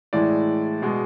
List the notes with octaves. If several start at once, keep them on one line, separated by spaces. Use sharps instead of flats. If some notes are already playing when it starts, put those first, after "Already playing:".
A2 E3 G#3 D5
B2 G#3